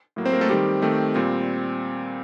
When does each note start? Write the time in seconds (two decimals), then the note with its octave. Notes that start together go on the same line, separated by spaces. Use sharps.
0.16 A2 F#3 A#3
0.25 C4 C5
0.33 A#3 A#4
0.41 A3 A4
0.49 D#3 G3 C4 G4
0.82 D#3 A3 C4
1.15 A#2 G3 C4